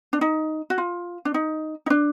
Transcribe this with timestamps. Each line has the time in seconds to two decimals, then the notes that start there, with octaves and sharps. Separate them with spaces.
0.13 D4
0.21 D#4
0.70 F#4
0.78 F4
1.25 D4
1.34 D#4
1.86 D#4
1.90 D4